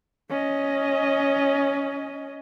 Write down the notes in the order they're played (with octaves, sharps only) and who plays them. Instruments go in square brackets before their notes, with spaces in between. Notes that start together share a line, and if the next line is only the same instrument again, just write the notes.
[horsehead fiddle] C#4 D#5